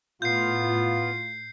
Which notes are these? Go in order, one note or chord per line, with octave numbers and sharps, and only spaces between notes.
A2 B3 F4 G6 C7